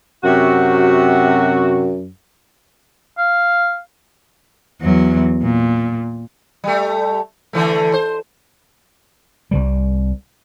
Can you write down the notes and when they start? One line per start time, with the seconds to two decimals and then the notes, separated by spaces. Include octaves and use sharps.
0.24 F#2 C3 F#4
3.18 F5
4.81 E2 F#3
5.42 A#2
6.64 G3 A3
7.53 D3 E3 A3
7.93 C5
9.51 C2 C3 G3